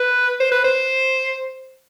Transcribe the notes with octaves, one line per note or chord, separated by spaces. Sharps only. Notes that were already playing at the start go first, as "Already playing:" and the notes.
Already playing: B4
C5
B4
C5